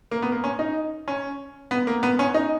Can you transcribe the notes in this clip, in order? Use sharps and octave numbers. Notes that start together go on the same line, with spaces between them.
A#3
B3
A#3
C#4
D#4
C#4
B3
A#3
B3
C#4
D#4